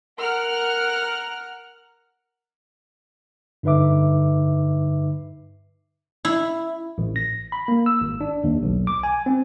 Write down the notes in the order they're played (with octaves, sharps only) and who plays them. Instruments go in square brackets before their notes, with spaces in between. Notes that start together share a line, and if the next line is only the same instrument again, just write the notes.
[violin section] A#4 F#5 F6 F#6
[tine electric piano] G2 D3 D#4 B4 E5 D6
[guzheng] E4
[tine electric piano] A1
A#6
B5
A#3
E6
G#1
D4
D#2
B1
D6
G#5
C4